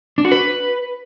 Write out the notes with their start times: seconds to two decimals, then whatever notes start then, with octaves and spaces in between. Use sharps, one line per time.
0.18 D4
0.25 F#4
0.31 B4